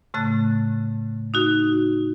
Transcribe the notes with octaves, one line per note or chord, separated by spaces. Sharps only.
A2 C#3 A3 F#6 A6
D#4 F#4